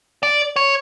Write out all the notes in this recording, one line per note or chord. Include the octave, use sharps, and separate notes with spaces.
D5
C#5